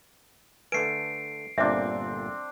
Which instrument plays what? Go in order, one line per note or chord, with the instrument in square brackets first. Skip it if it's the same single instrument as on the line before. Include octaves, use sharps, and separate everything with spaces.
[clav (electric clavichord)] D3 A3 G#5 [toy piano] B4 [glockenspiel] C7 D7
[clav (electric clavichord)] G1 A#2 D3 [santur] C4 D4 [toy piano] E5